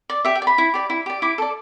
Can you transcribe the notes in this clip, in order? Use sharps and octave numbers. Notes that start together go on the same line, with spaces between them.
D5
G4 E5
G5
D5
B5
E4
G4 D5
E4
G4 D5
E4 D6
A4 D5